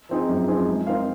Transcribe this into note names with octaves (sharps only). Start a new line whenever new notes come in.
F3 C4 D#4 G#4
F#2
F3 C4 D#4 G#4
G#3
C4 D#4 A#4 F5